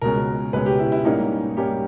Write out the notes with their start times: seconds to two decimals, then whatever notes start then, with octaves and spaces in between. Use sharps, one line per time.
0.02 C#2 B2 G#3 C#4 A#4
0.53 C#2 B2 G#3 C#4 B4
0.66 G4
0.79 E4
0.92 E4
1.05 G#2 G3 A#3 C#4 D#4
1.57 G#2 G3 A#3 C#4 G4